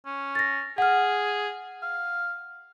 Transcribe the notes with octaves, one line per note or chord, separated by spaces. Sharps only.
C#4
A6 A#6
G#4 F#5 F6
F5